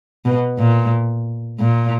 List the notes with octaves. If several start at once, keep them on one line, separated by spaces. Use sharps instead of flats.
B2
A#2
A#2